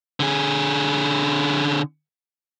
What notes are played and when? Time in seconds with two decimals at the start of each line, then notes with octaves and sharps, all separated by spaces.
0.20 D3 G#4